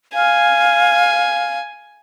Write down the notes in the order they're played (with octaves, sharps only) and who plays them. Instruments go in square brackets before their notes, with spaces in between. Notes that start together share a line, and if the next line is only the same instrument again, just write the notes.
[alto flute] F5 [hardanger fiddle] G#5